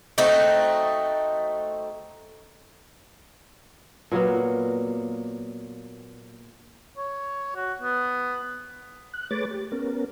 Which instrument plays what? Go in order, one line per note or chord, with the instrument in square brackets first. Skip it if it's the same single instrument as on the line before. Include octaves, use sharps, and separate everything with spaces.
[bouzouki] A3 C4 D#4 F#4
[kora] A#2 F#3 A#3 B3
[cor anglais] C#5
F#4
B3
[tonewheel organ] F#6
A3 G#4 B4 C#5 D6 A6
G4
B3 C#4 A#4